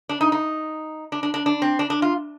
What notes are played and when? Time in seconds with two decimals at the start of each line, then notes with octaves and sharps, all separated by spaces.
0.09 D4
0.21 D#4
0.32 D#4
1.12 D4
1.23 D4
1.34 D4
1.46 D4
1.62 C4
1.79 D4
1.90 D4
2.02 F4